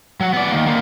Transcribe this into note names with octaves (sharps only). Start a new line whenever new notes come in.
F#3 F#5
B3 D5
D#3 A#3
D3 A#3